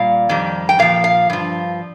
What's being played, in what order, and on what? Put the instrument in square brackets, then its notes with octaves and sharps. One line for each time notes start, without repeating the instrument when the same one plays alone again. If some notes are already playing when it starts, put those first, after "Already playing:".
Already playing: [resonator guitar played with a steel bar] A#2 G3 F5
F2 D#3 G3
G5
A#2 F3 F5
F5
G2 F3